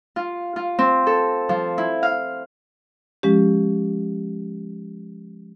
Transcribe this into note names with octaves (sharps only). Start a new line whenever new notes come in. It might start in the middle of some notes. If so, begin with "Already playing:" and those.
F4
F4
C4
A4
F3
E4
F5
F3 G#3 C#4 G4